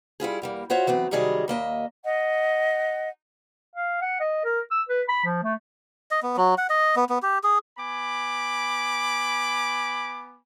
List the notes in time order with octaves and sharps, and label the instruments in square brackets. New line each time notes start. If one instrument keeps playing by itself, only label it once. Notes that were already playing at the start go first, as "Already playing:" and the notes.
[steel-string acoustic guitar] G3 E4 F4 G#4
E2 G3 A#3
F4 F#4 C5 C#5 E5
E3 F#3 B3 C4
C3 D#3 F#3 G3 G#4 D#5
D#2 A#3 D#5 E5
[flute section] D#5 F#5
[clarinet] F5
F#5
D#5
A#4
E6
B4
B5
F3
A3
[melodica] D#5
B3
F#3
F#5
D#5
B3
B3
G4
G#4
[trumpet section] B3 G#5 B5 D6